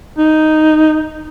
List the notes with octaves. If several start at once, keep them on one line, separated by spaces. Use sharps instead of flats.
D#4